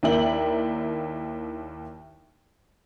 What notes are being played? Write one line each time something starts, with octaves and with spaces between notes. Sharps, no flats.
D#2 A#3 E4 D5 G5 F#7